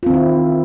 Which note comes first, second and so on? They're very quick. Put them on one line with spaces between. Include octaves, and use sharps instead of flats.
F4 C4 D#3 E4